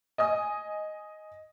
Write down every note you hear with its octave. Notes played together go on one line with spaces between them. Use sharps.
D#5 G#5 D#6